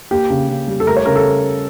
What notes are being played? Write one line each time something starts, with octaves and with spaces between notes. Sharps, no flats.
A#3 G4
C#3
C#3
G3
A4
A3 A#4
C#5
C#3 A#4
A4